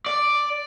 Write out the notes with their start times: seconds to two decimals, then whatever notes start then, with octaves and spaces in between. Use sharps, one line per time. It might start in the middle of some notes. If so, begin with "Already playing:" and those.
0.06 D5